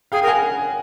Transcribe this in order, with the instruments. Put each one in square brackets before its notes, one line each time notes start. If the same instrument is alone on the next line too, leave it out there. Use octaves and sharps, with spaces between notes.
[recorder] G#4 [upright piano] F5 G5
[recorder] A#4
[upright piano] F#5 G#5